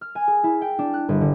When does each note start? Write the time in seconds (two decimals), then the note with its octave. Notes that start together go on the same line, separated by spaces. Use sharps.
0.01 F6
0.15 G#5
0.28 G#4
0.44 E4
0.61 G5
0.79 D4
0.94 F#6
1.09 G1
1.21 D3